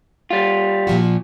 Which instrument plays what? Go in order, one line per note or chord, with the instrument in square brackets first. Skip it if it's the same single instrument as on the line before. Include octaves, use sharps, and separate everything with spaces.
[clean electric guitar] G3 F4
[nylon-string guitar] A#2 F3 F#4